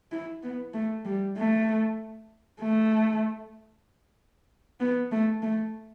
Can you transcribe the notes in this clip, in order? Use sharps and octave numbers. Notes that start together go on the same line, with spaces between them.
E4
B3
A3
G3
A3
A3
B3
A3
A3